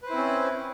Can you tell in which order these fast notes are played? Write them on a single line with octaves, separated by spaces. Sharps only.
B4 C5 E4 C4 C#4